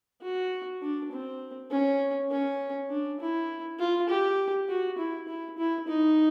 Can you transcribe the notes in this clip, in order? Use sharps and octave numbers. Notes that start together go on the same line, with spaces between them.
F#4
D4
C4
C#4
C#4
D4
E4
F4
G4
F#4
E4
E4
E4
D#4